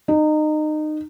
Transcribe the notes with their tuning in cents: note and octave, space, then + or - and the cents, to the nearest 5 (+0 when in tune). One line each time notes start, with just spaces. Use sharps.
D#4 -25